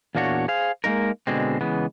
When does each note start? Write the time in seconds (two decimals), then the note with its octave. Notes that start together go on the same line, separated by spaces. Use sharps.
0.15 E2 A#2 A#3 D4 F#4 C#5
0.48 G#4 C5 F5
0.84 G#3 A#3 D#4 A#4
1.27 B2 D3 G#3 C4
1.61 C#3 E3 G#3 B3